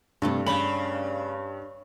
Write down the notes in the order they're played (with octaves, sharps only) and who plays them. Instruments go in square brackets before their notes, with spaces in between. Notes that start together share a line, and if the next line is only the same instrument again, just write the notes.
[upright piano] G2 [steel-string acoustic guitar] C3 A3 D4
[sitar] C#3 [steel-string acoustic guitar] C#4 D4 D5 [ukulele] B5